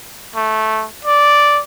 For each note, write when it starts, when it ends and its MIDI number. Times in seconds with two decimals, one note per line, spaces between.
0.36 0.85 57
1.05 1.61 74